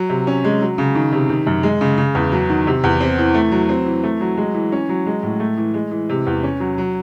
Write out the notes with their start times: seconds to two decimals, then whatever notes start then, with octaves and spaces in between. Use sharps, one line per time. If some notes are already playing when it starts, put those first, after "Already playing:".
Already playing: F#3
0.10 C3
0.27 C#4
0.44 G#3
0.61 F#3
0.78 C#3
0.95 D#3
1.12 C3
1.29 D#3
1.47 F#2
1.63 G#3
1.81 C#3
1.98 C#3
2.15 E2
2.32 F#3
2.50 D#3
2.67 C3
2.84 E2
3.01 C4
3.19 E3
3.34 A3
3.52 F#3
3.69 C4
3.86 E3
4.04 A3
4.21 F#3
4.37 G#3
4.54 E3
4.72 C#4
4.89 F#3
5.06 G#3
5.23 A2
5.40 A3
5.57 E3
5.74 G#3
5.91 E3
6.09 C3
6.27 E2
6.43 C#4
6.60 F#3
6.78 F#3